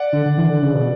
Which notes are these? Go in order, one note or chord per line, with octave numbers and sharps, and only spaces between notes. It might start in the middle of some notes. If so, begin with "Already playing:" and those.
Already playing: D5 F#5
D3
D3
E3
D3
C#3
B2